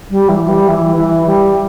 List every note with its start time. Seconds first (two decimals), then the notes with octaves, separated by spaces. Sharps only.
0.10 G3
0.29 E3
0.49 G3
0.69 E3
0.97 E3
1.26 G3